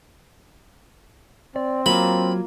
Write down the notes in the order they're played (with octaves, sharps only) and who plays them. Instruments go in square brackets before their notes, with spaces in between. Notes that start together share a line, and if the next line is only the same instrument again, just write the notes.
[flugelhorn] C4 [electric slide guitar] D5
[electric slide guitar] F#3 [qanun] A#3 F4 [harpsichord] B5